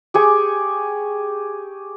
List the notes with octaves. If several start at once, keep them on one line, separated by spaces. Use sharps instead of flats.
G4 G#4 C#6